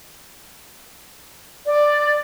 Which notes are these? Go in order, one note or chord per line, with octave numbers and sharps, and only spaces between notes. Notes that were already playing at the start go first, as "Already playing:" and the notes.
D5